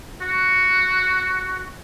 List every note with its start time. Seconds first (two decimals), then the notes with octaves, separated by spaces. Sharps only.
0.22 F#4